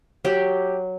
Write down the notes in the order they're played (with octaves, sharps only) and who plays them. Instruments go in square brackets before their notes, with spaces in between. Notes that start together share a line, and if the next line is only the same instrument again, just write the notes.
[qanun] F#3 G4